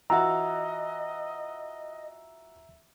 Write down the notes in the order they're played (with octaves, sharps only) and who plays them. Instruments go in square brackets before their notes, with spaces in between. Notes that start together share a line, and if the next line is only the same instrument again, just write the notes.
[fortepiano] E3 F4 F#4 [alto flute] D#5 [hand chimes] E5 E6 [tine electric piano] A#5